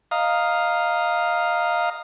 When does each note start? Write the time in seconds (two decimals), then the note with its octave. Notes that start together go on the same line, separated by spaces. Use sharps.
0.11 D#5 F5 A#5